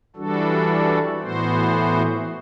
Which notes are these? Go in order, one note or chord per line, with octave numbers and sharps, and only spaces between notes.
E3 G3 D4 F#4 A4
A2 E3 B3 F#4 C5